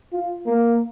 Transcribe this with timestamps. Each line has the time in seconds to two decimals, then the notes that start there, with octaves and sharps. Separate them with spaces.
0.13 F4
0.46 A#3